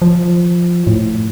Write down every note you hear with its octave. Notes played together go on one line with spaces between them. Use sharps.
F3
A2